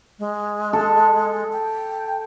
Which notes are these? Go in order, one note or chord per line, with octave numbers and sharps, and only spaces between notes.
G#3
A4
G5